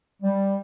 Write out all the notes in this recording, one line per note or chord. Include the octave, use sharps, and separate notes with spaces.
G3